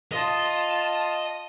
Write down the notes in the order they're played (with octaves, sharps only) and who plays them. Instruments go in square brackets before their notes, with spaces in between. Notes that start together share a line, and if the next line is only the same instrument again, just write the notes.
[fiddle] F4 A5 [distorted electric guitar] D#5